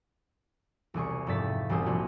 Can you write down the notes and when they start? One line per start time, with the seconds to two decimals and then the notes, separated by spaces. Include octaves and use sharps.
0.94 E1 C2 G#4 C#6
1.27 F1 G#2 C4 E5 A6 B6
1.69 E1 C2 C5 G#5 D#6
1.86 A#1 F#4 C6